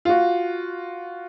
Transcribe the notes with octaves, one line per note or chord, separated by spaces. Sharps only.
F4 F#4